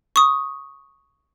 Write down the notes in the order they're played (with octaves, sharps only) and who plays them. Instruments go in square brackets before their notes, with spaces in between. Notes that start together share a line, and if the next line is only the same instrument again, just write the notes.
[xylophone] C#6 D#6